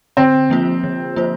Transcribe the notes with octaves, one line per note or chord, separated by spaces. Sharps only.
D3 C4
F3 A#3 F4 C5
D3
F3 A#3 F4 C5